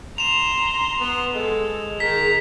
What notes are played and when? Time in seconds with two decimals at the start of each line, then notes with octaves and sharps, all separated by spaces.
0.18 A#5 C6 E7 F7
1.00 B3
1.34 G#3 A4
2.00 D#3 G#4 A#5 B6